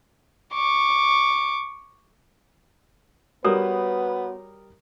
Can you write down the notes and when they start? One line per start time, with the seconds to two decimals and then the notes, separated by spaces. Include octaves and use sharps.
0.54 C#6 D6
3.44 G3 B3 F#4 A#4 B4 C#5 D#6